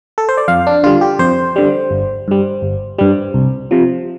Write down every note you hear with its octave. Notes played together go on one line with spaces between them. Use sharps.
A4
C5
D5
F2 F5
D4
D3 G3 F4
G4
F2 C5
D3 G3
G1
G2 G3
G1
G2 G3
C2
C3 F3